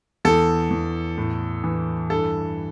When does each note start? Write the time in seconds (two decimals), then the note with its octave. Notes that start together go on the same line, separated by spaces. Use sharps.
0.25 E2 A4
0.70 E2
1.17 A2
1.64 E3
2.10 G2 A4